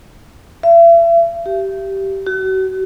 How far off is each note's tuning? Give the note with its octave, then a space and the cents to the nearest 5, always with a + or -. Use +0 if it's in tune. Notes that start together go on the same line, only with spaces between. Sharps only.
E5 +40
G4 -15
F#4 +40